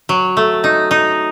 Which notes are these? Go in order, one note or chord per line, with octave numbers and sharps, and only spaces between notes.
F#3
A3
D#4
D#4